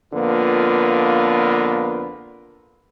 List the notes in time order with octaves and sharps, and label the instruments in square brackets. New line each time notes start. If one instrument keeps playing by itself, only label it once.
[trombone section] F2 D3 A#3 B3 F4 B4